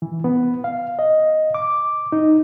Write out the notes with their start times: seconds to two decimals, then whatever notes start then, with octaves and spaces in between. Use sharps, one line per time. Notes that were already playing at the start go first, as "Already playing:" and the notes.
0.02 E3
0.24 B3
0.64 F5
0.99 D#5
1.54 D6
2.12 D#4